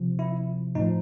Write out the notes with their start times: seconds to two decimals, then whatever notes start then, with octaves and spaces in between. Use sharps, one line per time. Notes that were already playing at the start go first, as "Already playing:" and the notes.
Already playing: C3 F3
0.19 E4
0.75 A2 F3 D#4